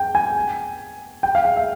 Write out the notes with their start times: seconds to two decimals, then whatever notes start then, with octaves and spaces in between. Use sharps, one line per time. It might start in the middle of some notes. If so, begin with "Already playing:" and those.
Already playing: G5
0.15 G#5
1.23 G5
1.35 F5
1.45 F5
1.56 E5